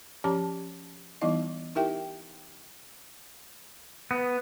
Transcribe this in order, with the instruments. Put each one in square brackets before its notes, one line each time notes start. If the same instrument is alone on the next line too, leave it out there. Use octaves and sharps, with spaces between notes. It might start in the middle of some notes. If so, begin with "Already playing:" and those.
[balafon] F3 C#4 G4 C#5 A5
E3 G3 B3 D#4 E4 D#5
D#4 E4 G4 A#4 E5 G5
[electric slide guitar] B3